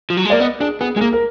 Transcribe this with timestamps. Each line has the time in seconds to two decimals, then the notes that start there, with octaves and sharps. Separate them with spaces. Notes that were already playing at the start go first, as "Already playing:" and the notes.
0.10 F3
0.17 F#3
0.25 G#3
0.30 A#3 D5
0.40 B3 D#5
0.60 D4 G#4
0.81 B3 G#4
0.96 G#3 G#4
1.00 A#3 A#4
1.13 A#4